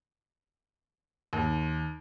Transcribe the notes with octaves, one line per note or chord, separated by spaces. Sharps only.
D#2